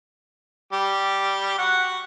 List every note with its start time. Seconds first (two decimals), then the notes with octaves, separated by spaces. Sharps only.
0.73 G3 G4
1.58 F#4 F#5